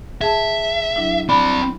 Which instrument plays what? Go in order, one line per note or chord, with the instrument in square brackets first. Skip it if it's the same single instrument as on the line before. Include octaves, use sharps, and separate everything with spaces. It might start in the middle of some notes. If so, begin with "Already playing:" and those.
[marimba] G#4 A5 [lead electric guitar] E5
[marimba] F#3 D4 E4
[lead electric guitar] C4 D5 [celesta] B5